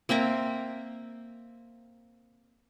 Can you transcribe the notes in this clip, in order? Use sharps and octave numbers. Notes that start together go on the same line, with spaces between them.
A#3 C4 E5 A#5